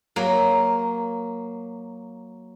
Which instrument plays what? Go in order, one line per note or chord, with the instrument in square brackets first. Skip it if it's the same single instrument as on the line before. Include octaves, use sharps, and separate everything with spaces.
[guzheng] F#3 A#3